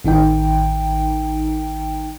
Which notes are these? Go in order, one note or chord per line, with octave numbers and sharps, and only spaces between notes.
A1 D#3 D#4 G5